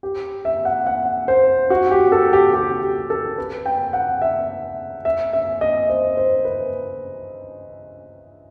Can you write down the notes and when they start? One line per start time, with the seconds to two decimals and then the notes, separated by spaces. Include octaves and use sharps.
0.03 G4
0.45 E5
0.65 F#5
0.87 F#5
1.28 C5
1.70 F#4
1.91 G4
2.12 A4
2.33 G4
2.54 G4
2.82 G4
3.10 A4
3.38 B4
3.66 G5
3.93 F#5
4.22 E5
5.05 E5
5.33 E5
5.61 D#5
5.90 C5
6.17 C5
6.45 B4